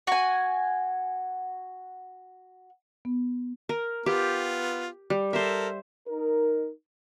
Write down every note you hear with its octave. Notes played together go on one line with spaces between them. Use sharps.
F#4 G#5
B3
A#4
B3 F4 G4
G3
A4 A#4 C5 E5
D#4 A#4